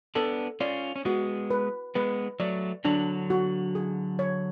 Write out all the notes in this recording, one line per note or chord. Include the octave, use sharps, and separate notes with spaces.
B3 D4 A4
C#4 F4 D5
C#4
G#3 B3 F#4
B4
G#3 B3 B4
F#3 A3 D5
D3 F#3 D4
F#4
G#4
C#5